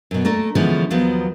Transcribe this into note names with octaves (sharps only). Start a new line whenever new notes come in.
F#2 B2
A3 A#3 D4 A#4
D3 E3 F3 G#3 B3 C#4
D#2 F3 F#3 B3